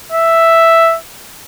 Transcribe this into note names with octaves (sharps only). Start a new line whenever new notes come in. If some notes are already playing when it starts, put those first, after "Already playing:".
E5